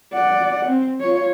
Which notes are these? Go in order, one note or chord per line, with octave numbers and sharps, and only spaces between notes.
D5 F#5
C4
F4 C#5